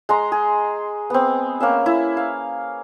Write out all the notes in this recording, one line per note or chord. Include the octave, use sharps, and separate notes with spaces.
G#3 A#5 C6
G#4
B3 C4
A#3 C#4 E5
E4 E5
F5